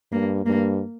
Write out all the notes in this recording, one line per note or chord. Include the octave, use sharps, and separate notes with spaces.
G2 A#3
G2 A#3